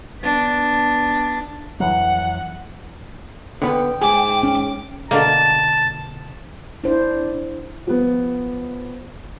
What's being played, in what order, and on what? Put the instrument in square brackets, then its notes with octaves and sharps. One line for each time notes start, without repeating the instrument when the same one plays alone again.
[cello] B3 D4
[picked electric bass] F2 E3 F#3 [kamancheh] F#5
[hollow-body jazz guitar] D3 B3 B4 [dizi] G5
[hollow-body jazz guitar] G#2 G#4 [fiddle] D6
[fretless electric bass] C#4
[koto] B2 D3 A#3 [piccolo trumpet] A5
[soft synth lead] D4 [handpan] E4 C5
[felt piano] F3 B3